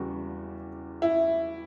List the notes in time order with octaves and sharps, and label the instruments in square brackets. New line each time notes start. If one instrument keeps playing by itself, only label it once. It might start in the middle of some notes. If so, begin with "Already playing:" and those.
Already playing: [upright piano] E2 C#3 G3 F#4
E4